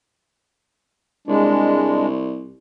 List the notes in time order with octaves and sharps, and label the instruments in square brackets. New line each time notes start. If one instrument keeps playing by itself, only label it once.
[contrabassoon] C2 [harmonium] G#3 D4